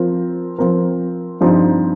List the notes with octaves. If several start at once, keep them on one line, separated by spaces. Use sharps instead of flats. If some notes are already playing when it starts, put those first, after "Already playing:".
Already playing: F3 C4 F4 A#4
F3 C4 F4 A#4
G2 F3 C4 D#4